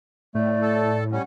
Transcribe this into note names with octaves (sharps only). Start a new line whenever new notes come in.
A2 A3 D5
A4
G3 C#4 F#5